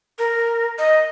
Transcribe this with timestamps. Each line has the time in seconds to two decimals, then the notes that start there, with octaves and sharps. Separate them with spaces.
0.18 A#4
0.78 D#5